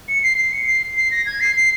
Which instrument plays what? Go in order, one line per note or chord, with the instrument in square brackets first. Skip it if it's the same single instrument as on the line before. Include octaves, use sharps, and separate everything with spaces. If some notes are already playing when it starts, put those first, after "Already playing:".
[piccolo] C#7
C7
C7
C#7
C7
C7
A#6
G#6
C7
C7